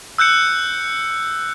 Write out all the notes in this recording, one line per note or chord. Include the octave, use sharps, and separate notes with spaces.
E6 F#6 G6 C#7